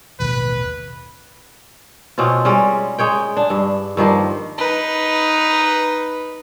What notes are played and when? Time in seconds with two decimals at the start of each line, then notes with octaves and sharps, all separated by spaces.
0.20 A1 D#2 B2 B4
2.18 B2 C4 C#4 F4
2.45 G3 G#3 C#4 D5
2.99 G#3 C#5 G5
3.37 D4
3.50 G2
3.97 G2 D#3 F3 A#3
4.58 D#4 B4